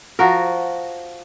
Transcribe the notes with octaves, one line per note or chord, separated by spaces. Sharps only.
F3 F#4 A#4